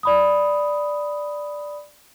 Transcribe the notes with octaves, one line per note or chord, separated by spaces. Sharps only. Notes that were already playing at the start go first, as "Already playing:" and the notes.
D5 B5 D#6